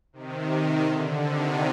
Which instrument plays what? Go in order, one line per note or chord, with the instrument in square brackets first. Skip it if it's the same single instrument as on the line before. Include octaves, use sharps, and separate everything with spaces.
[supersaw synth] C3 D#3
C3 D#3
D3
C3 D#3